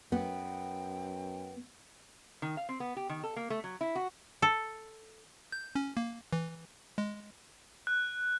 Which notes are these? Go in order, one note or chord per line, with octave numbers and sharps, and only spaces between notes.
F#2 B3 G5
D#3
F5
C4
B3
G4
D#3
A4
A#3
A3
F#3
E4
F#4
A4
G6
C#4
A#3
E3
G#3
F#6